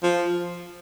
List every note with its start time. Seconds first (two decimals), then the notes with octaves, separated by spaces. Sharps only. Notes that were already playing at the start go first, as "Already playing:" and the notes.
0.03 F3